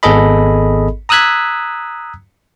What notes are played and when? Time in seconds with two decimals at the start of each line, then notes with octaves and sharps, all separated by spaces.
0.03 G#1 B3 G#4 A4 D#5 B5
1.09 A#5 D#6 E6 F#6 G#6 B6